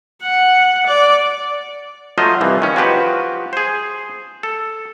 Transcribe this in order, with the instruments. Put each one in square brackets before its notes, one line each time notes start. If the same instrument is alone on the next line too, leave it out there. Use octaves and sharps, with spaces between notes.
[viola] F#5
D5
[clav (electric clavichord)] F3 F#3 A3 F4 C5 D#5
C2 E3 F3
D#3 C#4
F3 F#4 G4 B4
G#4 C5
A4